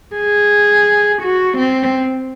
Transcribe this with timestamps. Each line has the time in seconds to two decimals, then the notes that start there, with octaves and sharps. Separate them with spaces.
0.16 G#4
1.22 F#4
1.58 C4